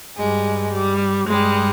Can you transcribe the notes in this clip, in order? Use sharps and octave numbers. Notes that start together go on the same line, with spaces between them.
G2 G3 G#3
G3
G2 G3 G#3